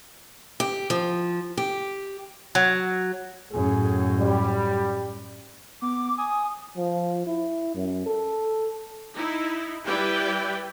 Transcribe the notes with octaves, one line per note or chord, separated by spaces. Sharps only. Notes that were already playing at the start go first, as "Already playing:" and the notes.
G4
F3
G4
F#3
F#2 A2 G#4
G3
B3 D6
G#5 D#6
F3
E4
F#2
A4
D#4 E4
G3 E4 G4 B4 D5 G5